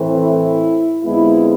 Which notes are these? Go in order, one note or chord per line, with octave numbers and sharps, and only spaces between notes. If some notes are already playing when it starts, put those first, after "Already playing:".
Already playing: A2 E3 A3 C4
E4
F2 D3 G#3 B3 E4